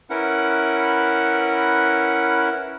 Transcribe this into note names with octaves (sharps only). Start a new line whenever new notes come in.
C#4 E4 A#4 B4 F#5